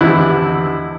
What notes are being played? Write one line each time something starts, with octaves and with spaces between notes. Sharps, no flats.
G#1 E2 D3 G3 E4 F#6